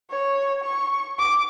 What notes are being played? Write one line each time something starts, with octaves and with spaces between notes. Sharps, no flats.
C#5
C#6
D6